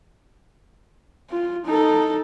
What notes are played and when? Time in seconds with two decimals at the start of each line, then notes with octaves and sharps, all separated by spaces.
1.30 F4
1.66 D#4 A4